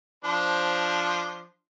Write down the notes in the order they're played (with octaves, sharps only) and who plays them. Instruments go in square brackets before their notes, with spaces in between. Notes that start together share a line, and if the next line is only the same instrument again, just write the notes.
[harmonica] F3 D4 C5